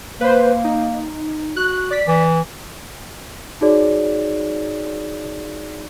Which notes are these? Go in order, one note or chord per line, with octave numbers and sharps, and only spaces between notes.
A#3 B4 C5
D#4
F#4 F#6
D5 B6
E3
D#4 F#4 G#4 C#5 D5